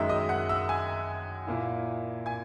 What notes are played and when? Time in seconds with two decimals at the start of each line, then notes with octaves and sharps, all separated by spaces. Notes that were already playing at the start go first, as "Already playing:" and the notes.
Already playing: F#2 D#3 G#3 D#4 E5 E6
0.09 D#5 D#6
0.29 F#5 F#6
0.49 E5 E6
0.69 G#5 G#6
1.47 A#2 A#3 E4
2.26 G#5 G#6